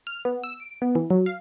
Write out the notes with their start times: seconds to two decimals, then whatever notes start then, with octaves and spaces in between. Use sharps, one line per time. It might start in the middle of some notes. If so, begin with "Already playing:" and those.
0.07 F6
0.25 B3
0.44 E6
0.60 D7
0.82 B3
0.95 E3
1.10 F#3
1.26 F5